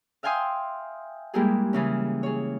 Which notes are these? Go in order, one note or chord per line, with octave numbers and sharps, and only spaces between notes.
E5 F5 G5 G#5 C6 D#6
G3 G#3 A#3 E4 G4 G#4
C#3 E3 C#4
G#4 C#5